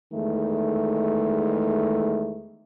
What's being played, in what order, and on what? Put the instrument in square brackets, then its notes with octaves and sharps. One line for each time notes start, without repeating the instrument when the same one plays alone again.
[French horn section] E2 D#3 G#3 A3